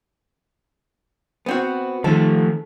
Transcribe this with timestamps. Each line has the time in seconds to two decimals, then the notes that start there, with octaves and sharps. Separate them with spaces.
1.46 B3 C4 F#4
2.04 D#3 F3 A3 A4